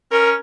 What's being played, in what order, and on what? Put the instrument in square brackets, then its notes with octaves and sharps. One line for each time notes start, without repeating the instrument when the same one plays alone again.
[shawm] C#4 [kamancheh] A#4